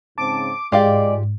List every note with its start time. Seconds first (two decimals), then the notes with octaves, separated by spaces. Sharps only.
0.18 G#2 C#3 C4 A5 D6
0.72 G#2 G#3 F4 G4 D5 F5